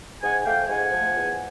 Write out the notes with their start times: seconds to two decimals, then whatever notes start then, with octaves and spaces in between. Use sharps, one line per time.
0.22 G#2 F#5 G#5
0.46 F3 A3 F5 G5
0.69 G#2 F#5 G#5
0.93 F3 A3
1.15 E2